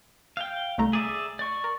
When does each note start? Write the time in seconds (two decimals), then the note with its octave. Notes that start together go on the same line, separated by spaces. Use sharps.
0.37 F5 G5
0.78 C2 A3 A#5
0.93 G#4 D5 E5
1.39 D5 C#6
1.64 A#4